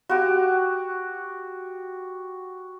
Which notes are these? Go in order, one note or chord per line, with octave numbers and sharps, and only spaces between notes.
F#4 G4